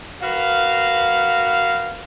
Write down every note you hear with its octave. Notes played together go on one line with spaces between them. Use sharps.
F#4 A#4 B4 F5